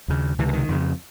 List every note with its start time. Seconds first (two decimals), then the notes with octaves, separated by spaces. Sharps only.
0.08 D#2 C#3
0.39 C#2 C3 E3
0.49 D3
0.53 D#3
0.69 F2 C#3